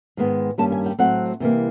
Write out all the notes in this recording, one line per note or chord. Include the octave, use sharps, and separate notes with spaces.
G#2 D#3 G#3 B3
G2 D#3 G3 A#3 C#4 A5
G#5
G5
A2 F#3 A3 C4 F#5
C3 E3 G3 A#3